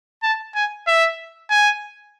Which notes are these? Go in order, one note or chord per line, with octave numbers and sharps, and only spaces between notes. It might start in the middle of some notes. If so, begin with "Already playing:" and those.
A5
G#5
E5
G#5